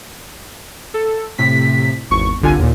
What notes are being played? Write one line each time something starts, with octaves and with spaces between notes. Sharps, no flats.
A4
A2 C3 B6
G#1 E2 C#6
G1 C2 D3 F4 G#5
D#2 A#2